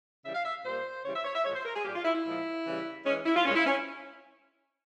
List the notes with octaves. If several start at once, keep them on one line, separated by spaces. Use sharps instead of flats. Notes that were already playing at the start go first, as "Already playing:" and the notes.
C#3 E3 G3 E5
F5
E5
A#2 G3 A#3 C5
C#3 E3 G3 C#5
E5
C#5
E5
A#2 F3 G#3 C#5
C5
A#4
G#4
A#2 G3 A#3 G4
F4
E4
E4
A#2 F3 G#3
C#3 E3 G3
E3 G#3 C#4
E4
F4
A#2 G#3 C#4
E4
C#4